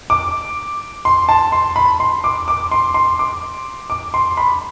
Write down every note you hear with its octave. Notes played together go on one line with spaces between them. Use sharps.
D6
C6
A5
C6
B5
C6
D6
D6
C6
C6
D6
D6
C6
B5